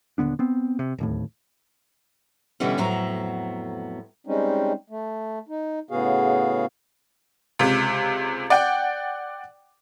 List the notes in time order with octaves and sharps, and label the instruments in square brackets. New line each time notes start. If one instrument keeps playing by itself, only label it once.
[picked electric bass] D#1 D3 B3 D4
B3 C4
C3
D1 D#2 A2
[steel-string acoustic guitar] B2 D3 E3 G3 B3 C#4
F2 A2 F#3 B3 C5 A#5
[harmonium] G3 G#3 C4 C#4 D#4
A3
D#4
A2 C#3 B3 F#4 G#4 F5
[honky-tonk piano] C#2 C3
D5 F#5 G5